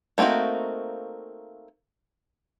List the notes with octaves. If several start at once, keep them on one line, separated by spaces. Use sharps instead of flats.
A3 A#3 C4 D#4 F#4